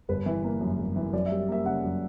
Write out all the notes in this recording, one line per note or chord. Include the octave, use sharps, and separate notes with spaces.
G1 B4
E3
A#3
F#2
G1
E3
F#2 D5
G3 E5
A#3 E5
C#3 F#5
F#2